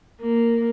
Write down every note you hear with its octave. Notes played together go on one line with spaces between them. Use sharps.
A#3